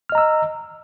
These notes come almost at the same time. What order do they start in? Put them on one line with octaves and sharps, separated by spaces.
F6 D#5 A#5 E6